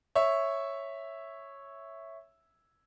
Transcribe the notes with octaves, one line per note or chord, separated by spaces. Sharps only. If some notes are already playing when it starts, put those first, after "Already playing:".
C#5 E5